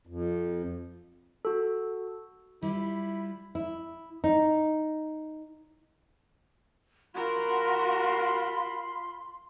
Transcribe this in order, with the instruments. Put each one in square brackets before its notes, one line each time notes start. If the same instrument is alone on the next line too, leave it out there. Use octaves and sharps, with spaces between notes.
[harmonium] F2
[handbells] F#4 A4
[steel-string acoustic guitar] G3 F4 [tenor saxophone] E4
[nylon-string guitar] E4
D#4
[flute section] F4 B5 C6 [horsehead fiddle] F#4 A#4